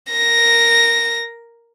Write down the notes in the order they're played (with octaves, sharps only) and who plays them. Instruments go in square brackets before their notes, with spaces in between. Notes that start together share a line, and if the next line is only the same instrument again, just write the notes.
[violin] A#4 A#6